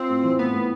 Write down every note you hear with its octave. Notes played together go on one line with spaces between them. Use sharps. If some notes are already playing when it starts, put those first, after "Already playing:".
Already playing: C4 F4
A2
E3
A2 B3
A2